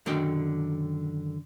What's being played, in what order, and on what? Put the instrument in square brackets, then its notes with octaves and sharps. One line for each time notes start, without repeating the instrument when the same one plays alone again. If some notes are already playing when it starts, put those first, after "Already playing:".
[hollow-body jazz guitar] F#2 D3 D#3 D5 G5